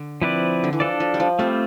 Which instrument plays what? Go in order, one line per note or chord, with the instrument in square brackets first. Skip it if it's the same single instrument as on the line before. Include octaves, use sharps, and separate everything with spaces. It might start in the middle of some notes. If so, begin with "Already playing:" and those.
Already playing: [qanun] D3
[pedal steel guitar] F3 C4 E4 B4 D5
[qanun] D3
E3
[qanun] F3 [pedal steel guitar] D4 A4 D5
[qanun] F3
G3
F3
[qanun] G3 [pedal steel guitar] A3 C4 F4